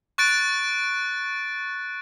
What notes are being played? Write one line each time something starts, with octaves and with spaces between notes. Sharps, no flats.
C#6 F#6 A6 D7